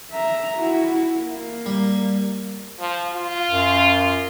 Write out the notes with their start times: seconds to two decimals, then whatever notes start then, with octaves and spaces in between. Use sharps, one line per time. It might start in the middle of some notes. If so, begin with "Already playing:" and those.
0.12 E5 A#5
0.57 E4 F#4
1.18 A#3
1.66 G3
2.80 F3
3.14 F4
3.51 F#2